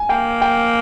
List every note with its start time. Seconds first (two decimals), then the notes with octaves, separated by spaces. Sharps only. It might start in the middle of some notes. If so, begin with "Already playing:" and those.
Already playing: G#5
0.09 A#3 G5
0.42 G5